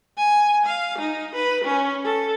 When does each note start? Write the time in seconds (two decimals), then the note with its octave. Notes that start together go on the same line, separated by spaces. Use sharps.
0.17 G#5
0.66 F5
0.99 D#4
1.35 B4
1.64 C#4
2.04 A4